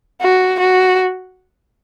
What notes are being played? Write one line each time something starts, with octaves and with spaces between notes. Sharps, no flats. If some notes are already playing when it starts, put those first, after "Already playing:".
F#4
F#4